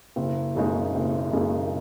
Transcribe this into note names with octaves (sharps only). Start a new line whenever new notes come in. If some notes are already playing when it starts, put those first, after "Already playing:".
F#1
F#2 C#3 G#3 D#4
F#1
F#2 C#3 G#3 D#4